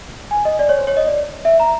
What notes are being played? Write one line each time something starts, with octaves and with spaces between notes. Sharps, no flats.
G#5
D#5
D5
C#5
C5
C#5
D#5
D5
E5
A#5